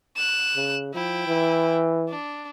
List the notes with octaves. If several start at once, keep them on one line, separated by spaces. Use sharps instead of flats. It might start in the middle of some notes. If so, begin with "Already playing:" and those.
F#6 E7
C#3
F3 E4 G5
E3
D4